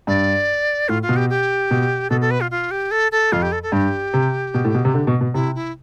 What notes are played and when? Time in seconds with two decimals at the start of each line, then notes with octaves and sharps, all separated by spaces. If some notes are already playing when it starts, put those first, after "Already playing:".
0.07 G2 D5
0.89 A2 F4
1.03 F4
1.09 B2
1.16 G4
1.30 G4
1.71 B2
2.10 B2 A4
2.21 A4
2.31 B4
2.41 F4
2.51 F4
2.71 G4
2.91 A4
3.12 A4
3.32 F2 F4
3.42 G4
3.52 A4
3.63 A4
3.72 G2 G4
4.14 C3
4.54 B2
4.64 A2
4.74 B2
4.85 C3
4.94 D3
5.07 B2
5.21 B2
5.34 C3 E4
5.55 E4